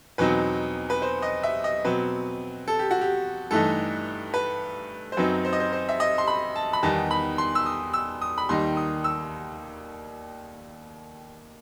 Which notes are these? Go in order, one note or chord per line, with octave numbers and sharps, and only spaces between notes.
E2 B2 F#3 C4 D#4 B4
B4
C5
D#5
E5
D#5
B2 F#3 C4 B4
A4
G4
F#4
G4
G2 E3 A3 D#4 A4
B4
C5
F#2 F#3 C4 D#4 B4
C5
D#5
C5
C5
E5
D#5
C6
B5
A5
B5
E2 D#3 G3 B3 D#4 A5
B5
C6
E6
D#6
E6
D#6
B5
D#2 D#3 G3 D#4 C6
D#6
E6